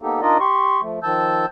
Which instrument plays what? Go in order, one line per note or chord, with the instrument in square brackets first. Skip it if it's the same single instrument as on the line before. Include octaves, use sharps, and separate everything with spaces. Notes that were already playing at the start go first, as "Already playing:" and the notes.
[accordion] A#3 B3 D#4 G4 A4
D4 D#4 F4 A#4 D5 D#5
G4 C6 C#6
F3 A3
D#3 F3 A5 E6 G6